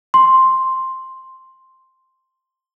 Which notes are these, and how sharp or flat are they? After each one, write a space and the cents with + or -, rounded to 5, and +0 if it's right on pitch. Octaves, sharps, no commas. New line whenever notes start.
C6 +5